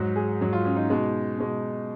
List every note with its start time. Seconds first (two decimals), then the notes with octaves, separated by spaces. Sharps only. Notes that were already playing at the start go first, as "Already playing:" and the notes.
Already playing: G#2 F#3 F#4
0.16 G#4
0.41 G#2 F#3
0.53 F4
0.65 C#4
0.77 D#4
0.90 B2 G#3
1.39 B2 G#3